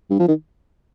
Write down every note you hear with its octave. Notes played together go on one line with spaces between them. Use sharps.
G2
F3
D#3